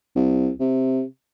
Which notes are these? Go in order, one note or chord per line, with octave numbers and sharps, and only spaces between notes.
C2
C3